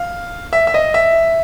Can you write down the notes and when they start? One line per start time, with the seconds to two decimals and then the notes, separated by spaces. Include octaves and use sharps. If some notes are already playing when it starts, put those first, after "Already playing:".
Already playing: F5
0.53 E5
0.67 E5
0.74 D#5
0.94 E5